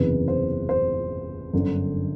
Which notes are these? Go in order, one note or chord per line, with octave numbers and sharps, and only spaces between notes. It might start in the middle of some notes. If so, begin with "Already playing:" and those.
Already playing: F#1 E2 C3 E3 B4
C5
C5
G1 F#2 D3